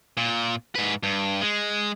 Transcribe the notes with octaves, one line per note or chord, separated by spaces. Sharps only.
A#2
G#2 B4
G2
G#3